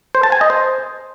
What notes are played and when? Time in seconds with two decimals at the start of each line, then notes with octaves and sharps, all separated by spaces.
0.15 C5
0.23 A5
0.32 G#5
0.41 D#5
0.50 C5